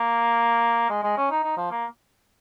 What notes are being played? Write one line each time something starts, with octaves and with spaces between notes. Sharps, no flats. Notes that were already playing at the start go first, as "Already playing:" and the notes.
Already playing: A#3
G#3
G#3
C#4
D#4
D#4
F3
A#3